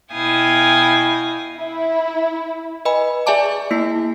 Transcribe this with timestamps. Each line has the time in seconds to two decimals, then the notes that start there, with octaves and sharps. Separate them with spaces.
0.12 B2 E4 F5 G5 G#5 D#6
1.58 E4
2.85 B4 D#5 G#5 B5
3.26 G#4 D5 E5 G#5 A5 D6
3.71 A#3 E4 C7